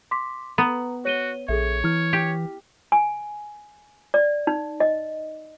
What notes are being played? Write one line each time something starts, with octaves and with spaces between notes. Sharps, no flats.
C6 D6 B6
B3 B4 A#5
F#4 C#5 D#7 G7
A#1 G#4 A4 C#5 E5
E3 E4 F6
G4
G#5
D5
D#4
D#5